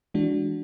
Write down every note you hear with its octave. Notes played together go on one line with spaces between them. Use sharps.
E3 G#3 D4 F#4